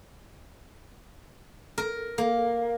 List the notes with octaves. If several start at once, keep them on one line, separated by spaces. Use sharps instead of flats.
A#4
A#3